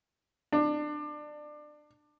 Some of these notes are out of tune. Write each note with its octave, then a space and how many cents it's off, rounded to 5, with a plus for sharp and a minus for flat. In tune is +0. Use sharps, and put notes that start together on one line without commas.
D4 +25